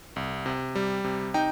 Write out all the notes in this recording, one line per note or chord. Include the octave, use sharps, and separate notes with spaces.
C2
C3
G3
C3
D#4 G5